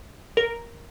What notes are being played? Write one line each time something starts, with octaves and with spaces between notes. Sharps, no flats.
A#4